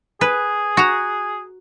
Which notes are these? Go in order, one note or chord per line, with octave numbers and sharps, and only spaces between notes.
G#4 B4
F#4 A#5